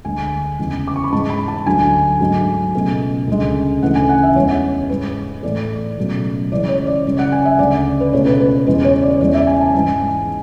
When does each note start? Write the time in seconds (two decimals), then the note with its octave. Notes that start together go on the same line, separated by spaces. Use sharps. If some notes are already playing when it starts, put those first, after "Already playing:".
0.05 D2 D3 G#3 G#5
0.59 E2 C#3 G#3
0.88 D6
0.96 C#6
1.04 B5
1.12 G#2 E3 G#3 A5
1.30 B5
1.48 A5
1.66 D2 D3 F#3 G#5
2.20 G#2 F#3 A3
2.75 C#2 B2 A3
3.28 D2 C#3 G#3
3.83 D2 C#3 E3 A3 F#5
3.95 G#5
4.09 F#5
4.23 E5
4.36 E2 C#3 G#3 C#5
4.90 G#2 G#3 B4
5.43 A2 E3 A3 D5
5.98 C#2 B2 F#3 A3
6.51 C#2 C#3 E3 G#3 D5
6.69 C#5
6.87 D5
7.06 F#2 C#3 G#3
7.19 F#5
7.32 G#5
7.45 E5
7.59 D2 C#3 G#3 D5
8.00 B4
8.13 C#2 B2 A3 C#5
8.26 B4
8.40 B4
8.67 E2 C#3 G#3 B4
8.85 C#5
9.03 D5
9.21 E2 C#3 G#3 D5
9.34 E5
9.47 G#5
9.61 A5
9.74 G#2 E3 G#3 G#5